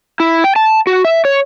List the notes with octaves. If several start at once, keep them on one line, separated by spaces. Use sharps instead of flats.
E4
G5
A5
F#4
E5
C#5